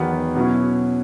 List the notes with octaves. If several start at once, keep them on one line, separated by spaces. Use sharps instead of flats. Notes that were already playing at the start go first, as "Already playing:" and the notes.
Already playing: E2 D#3 F#3 B3
B2 F#3 C#4 E4